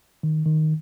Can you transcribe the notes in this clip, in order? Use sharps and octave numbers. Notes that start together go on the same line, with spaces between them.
D#3
D#3